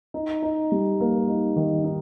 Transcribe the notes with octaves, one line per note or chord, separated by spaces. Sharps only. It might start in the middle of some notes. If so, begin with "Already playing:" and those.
D#4
D#4
G3
A#3
D#4
D#3
D#4